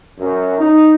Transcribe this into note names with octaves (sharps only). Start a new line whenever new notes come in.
F#2
D#4